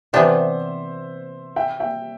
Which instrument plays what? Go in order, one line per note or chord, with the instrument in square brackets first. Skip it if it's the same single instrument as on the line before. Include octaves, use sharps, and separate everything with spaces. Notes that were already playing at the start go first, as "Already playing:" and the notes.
[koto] C3 E3 B3 D4 G4 [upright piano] C5 E5
[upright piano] E5 G5
E5 G5